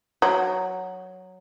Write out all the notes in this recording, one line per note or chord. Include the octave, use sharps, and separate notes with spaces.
F#3